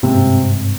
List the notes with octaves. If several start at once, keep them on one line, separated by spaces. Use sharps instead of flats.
G#2 C3
G2